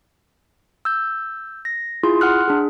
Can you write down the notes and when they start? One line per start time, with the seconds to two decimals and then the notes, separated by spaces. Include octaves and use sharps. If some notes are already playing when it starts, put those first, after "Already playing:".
0.85 E6 G6
1.65 A#6
2.03 E4 F4 G#4 C6
2.21 F#5 C6 F6 F#6
2.48 D4 G#4